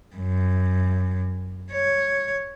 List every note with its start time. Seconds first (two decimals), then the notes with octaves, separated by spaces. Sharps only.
0.16 F#2
1.72 C#5